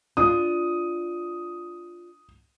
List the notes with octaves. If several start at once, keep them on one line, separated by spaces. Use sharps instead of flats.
D4 F4 D#6